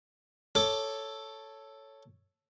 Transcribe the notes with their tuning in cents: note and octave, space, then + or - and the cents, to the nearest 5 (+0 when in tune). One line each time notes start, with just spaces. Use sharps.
A4 +0 C#5 +0 D6 +15